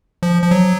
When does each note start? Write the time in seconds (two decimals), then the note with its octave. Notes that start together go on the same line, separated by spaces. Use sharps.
0.23 F3
0.43 F3
0.51 F#3